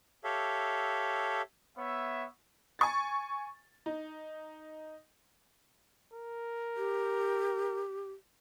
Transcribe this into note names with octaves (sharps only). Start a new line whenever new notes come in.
G4 A4 C#5 E5 F5
B3 C#5 E5
G#5 C#6 A6
D#4
A#4
G4